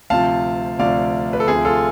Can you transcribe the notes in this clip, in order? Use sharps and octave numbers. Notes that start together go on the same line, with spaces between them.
D2 C3 F3 F5 A5
D2 C3 F3 D5 F5
B4
A4
D2 C3 F3 G#4
F4 A4